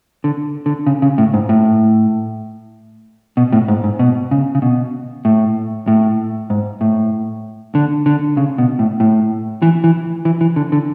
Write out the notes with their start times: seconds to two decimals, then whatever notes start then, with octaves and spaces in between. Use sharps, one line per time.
0.24 D3
0.66 D3
0.86 C#3
1.02 C#3
1.18 A2
1.34 G#2
1.49 A2
3.37 B2
3.52 A2
3.68 G#2
3.84 G#2
3.99 B2
4.31 C#3
4.55 C#3
4.62 B2
5.25 A2
5.88 A2
6.50 G#2
6.81 A2
7.75 D3
8.06 D3
8.37 C#3
8.58 B2
8.79 A2
9.00 A2
9.62 E3
9.84 E3
10.25 E3
10.41 E3
10.56 D3
10.72 D3